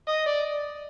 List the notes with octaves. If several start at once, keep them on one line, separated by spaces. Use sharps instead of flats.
D#5
D5